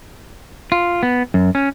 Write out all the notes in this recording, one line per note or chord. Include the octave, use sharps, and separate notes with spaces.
F4
B3
F#2
C#4